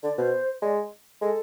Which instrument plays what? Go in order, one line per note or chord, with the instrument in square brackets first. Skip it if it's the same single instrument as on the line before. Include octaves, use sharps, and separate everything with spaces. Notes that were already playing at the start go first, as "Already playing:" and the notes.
[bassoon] D3 [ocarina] D5
[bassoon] B2 [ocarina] C5
[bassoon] G#3 [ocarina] D5
[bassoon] G#3 [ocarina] A4